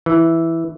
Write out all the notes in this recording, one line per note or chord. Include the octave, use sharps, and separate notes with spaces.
E3